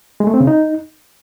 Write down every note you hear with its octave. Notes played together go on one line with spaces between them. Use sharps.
G#3
A3
C4
C#3
D#4